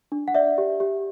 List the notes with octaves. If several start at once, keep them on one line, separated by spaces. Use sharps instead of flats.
D4
F#5
D5 E5
G4
G4